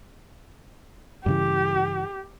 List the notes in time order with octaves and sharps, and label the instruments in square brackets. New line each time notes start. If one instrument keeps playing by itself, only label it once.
[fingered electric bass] G2 C#3 E3 [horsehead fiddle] G4